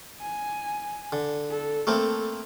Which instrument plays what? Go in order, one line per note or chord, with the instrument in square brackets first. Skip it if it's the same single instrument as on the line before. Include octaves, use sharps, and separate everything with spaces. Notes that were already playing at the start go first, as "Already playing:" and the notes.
[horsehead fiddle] G#5
[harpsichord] D3
[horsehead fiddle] A4
[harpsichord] A3 A#3 C4 [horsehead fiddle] A4